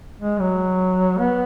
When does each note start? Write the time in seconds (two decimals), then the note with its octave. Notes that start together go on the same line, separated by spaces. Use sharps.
0.20 G#3
0.40 F#3
1.18 B3